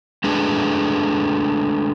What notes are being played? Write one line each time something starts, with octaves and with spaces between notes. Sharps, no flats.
G#3 A3 D4 G#4 B4